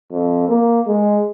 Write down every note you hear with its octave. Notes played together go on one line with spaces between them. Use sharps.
F2
A#3
G#3